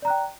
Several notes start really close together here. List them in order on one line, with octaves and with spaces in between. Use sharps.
D5 A#5 F#6 G5